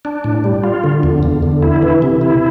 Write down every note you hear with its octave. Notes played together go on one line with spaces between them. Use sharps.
D4
A2
G3
F4
D3
E2
E2
D3
E4
E3
C3
E4